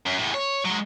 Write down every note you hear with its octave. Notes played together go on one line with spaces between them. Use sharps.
F#2
E2 A2
C#5
F#3 G#3